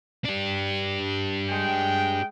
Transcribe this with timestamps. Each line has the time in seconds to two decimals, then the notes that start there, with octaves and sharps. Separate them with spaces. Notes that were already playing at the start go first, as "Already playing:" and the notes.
0.25 D4 G4
1.50 G#3 G5